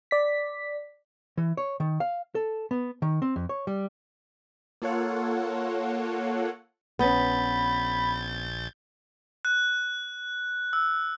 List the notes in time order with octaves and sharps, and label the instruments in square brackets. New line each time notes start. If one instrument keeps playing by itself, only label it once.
[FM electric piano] D5 B6
[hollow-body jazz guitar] E3
C#5
D#3
F5
A4
B3
D#3
C4
F2
C#5
G3
[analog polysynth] A#3 F4 A4 C#5 F#5
[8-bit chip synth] A#1 G6 A6 [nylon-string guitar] B3 C#4 [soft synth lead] B5
[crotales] F#6
E6